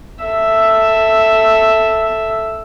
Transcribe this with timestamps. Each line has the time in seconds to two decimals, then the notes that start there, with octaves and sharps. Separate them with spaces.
0.23 A4 E5